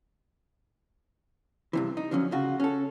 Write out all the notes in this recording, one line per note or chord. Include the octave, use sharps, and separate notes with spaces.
G2 C3 E3
D#4
D3 F3 F#3 C#4
C#3 F4 F#4
C#4 A4